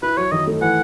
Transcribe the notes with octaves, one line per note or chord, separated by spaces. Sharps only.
E4 B4
F#3 C#5
D#3 D#5
A3
E3 F#5